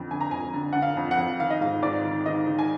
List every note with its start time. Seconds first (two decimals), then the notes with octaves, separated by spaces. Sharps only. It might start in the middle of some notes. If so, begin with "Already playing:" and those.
Already playing: F2 D3
0.11 D3 G#5
0.21 A#5
0.31 F2 G#5
0.54 D3
0.73 D3 F#5
0.82 F5
0.97 F2
1.11 F#5
1.18 F2
1.40 D#3 F5
1.50 D#5
1.61 G#2 F5
1.82 G#2 D5
2.05 D#3
2.26 D#3 D#5
2.47 D#3
2.59 G#5